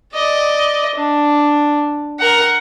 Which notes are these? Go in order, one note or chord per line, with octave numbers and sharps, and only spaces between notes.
D5 D#5
D4
A#4 F#5